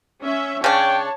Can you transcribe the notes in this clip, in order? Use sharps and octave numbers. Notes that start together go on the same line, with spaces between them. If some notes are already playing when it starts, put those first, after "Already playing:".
C#4 E5
C#3 D4 C#5 G5 A5